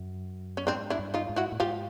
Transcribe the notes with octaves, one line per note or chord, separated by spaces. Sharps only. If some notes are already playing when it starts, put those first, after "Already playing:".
Already playing: F#2
C#4
G#2 C4 D4
D4 E4
G2
D#4 F4
G#2
E4 F#4
A2
G#2 F4 G4